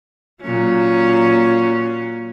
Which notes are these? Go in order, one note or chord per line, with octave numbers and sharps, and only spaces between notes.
A#2 F#3 C#4